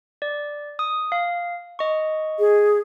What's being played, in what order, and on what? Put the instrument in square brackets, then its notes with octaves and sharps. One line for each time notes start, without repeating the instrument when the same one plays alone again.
[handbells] D5
D#6
F5
D#5 C#6
[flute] G#4